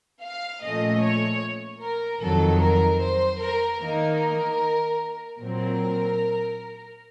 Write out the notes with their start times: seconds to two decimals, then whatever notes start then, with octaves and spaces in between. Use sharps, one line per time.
0.22 F5
0.62 A#2 F3 A3 C#4 D#5
1.02 C#5
1.81 A#4
2.22 F2 D#3 F#3 A4
2.61 A#4
3.01 C5
3.41 A#4
3.80 D#3 A#3 D#4 A#4
5.39 A#2 F#3 C4 A#4